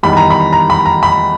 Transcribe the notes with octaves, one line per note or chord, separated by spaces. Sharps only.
E2 D#3 G3 B5
A#5
B5
A#5
B5
A#5
B5